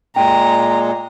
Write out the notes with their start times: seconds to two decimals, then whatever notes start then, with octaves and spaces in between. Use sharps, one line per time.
0.16 A#2 G#3 G5 A#5